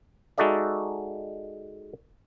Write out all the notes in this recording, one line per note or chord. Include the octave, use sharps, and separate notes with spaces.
G#3 D#4 F#4 A4 D5 E5